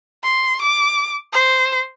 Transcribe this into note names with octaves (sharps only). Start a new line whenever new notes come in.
C6
D6
C5